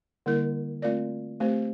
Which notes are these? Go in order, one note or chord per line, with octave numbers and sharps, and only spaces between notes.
D3 G3 A#3 E4 A#4
A3 C4 F4 A#4 D5
A3 C4 G4 C5